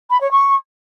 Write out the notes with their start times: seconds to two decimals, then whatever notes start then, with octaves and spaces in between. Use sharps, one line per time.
0.10 B5
0.21 C#5
0.31 C#6